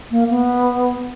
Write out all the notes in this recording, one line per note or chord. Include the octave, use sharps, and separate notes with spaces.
A#3
B3